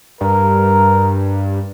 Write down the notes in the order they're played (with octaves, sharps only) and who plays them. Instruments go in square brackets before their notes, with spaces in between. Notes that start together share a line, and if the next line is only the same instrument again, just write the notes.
[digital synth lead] G2 [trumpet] A#4